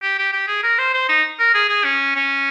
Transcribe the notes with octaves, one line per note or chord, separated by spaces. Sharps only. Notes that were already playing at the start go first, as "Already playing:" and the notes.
G4
G4
G4
G#4
A#4
C5
C5
D#4
A#4
G#4
G#4
C#4
C#4